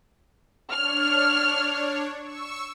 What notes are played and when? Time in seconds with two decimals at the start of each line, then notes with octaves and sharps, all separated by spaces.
0.72 D4 C#5 F6
2.20 C#6 E6